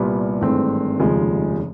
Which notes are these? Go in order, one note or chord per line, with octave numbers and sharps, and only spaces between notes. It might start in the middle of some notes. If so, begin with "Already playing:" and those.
Already playing: C2 A#2 G3 B3
G#1 G2 E3 A3 C4
F1 D#2 C#3 F3 G#3